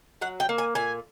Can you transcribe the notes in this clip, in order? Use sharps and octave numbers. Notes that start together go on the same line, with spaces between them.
F#3 F#5
G5
A#3
G#5
A#2 G#5